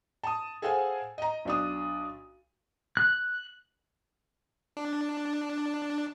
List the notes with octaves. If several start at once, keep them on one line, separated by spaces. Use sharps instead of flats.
A5 D#6
G#4 A4 C5 F5 F#5 G#5
D#5 A#5
B1 D4 D#6
F#6
D4